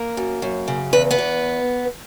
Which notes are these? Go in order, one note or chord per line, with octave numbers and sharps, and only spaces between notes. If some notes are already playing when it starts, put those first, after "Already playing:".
Already playing: A#3 A#4
F#2
F#2
C#3
E2 B4
B3 B4
E2